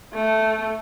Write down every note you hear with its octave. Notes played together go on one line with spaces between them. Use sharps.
A3